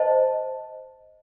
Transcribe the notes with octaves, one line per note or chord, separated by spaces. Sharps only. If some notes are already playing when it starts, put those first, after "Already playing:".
Already playing: C5 D#5 A5